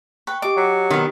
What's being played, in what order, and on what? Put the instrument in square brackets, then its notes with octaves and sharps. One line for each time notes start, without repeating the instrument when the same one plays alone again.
[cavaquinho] B4 [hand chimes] G5 C#6
[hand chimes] G4 D#5 [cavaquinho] D6
[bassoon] F#3
[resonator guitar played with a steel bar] D#3 B3